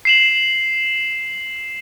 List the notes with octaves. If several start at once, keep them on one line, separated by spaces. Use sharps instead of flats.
C7 E7 F#7